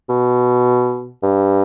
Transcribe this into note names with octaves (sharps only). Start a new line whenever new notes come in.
B2
G2